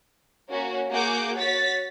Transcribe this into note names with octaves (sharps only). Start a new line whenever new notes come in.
A#3 C#4 F#4 A#4
A#3 F#4 G#4 F#5 D6 G6
F#4 C#5 A6 B6